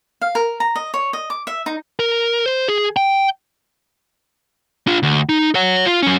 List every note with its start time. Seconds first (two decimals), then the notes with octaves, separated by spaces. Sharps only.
0.22 F5
0.35 A#4
0.60 A#5
0.76 D#5
0.94 C#5
1.13 D#5
1.30 D6
1.47 E5
1.66 D#4
1.99 A#4
2.46 C5
2.68 G#4
2.96 G5
4.87 D4 F4
5.03 D2
5.29 D#4
5.55 C#5 F#5
5.86 F4
6.02 F#2 C#4